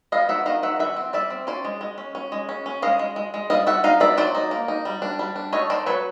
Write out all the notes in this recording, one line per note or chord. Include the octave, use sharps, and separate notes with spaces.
B3 D#5 F5
D#3 E5 F#5
D#3 D#5 F5
D#3 E5 F#5
E3 E5 F#5
C4
G3 D5 E5
C4
C#4 C5 D5
G#3
G#3
C#4
C#4
G#3
C#4
C#4
G#3 D#5 F5
G#3
G#3
G#3
G3 D#5 F5
G3 E5 F#5
D#4 D#5 F5
B3 D5 E5
F#3 C5 D5
D#4
A#3
D#4
G3
D4
G3
D4
A3 C#5 D#5
D#3 C5 D5
F#3 B4 C#5